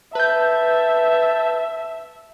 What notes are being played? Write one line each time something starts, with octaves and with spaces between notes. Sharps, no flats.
B4 E5 A5 G6